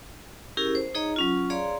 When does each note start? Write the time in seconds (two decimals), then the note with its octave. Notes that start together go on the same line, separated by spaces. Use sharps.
0.57 C#4 E4 G4 G#4 A#4
0.75 C5
0.94 D#4 G#4 C#5 D#5 A#5
1.16 F#3 C#4 F4
1.50 G#4 C#5 D5 F5 A#5 C6